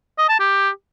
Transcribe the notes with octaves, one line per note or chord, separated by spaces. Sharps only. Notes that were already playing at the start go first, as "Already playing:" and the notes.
D#5
A5
G4